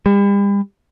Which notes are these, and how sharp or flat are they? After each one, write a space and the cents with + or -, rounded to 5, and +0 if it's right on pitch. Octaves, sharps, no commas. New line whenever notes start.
G3 +40